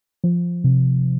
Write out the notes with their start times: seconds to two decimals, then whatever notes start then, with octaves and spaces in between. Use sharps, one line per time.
0.24 F3
0.64 C3